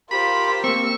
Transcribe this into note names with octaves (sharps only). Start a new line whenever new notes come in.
F4 G4 A#4 C5 B5
A#3 C4 C#6 E6